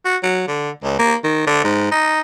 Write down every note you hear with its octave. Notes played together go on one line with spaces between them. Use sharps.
F#4
F#3
D3
C#2
A#3
D#3
D3
G#2
D#4